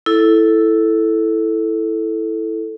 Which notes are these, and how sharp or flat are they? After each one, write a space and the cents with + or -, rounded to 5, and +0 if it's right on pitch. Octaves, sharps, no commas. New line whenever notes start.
E4 +0 A4 +0